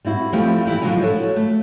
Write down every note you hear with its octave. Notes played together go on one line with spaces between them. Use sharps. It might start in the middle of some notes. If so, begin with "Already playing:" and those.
G3 C4 E4 F#4
F3 G3 A3 C4 G4
E3 E4 G4 G5
D3 F3 F#3 G#3 C#4 G#5
F#4 A4 C#5
A3